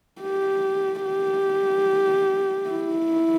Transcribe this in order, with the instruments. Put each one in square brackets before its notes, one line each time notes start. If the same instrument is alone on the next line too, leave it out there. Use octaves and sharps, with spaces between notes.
[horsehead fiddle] G4
G4
E4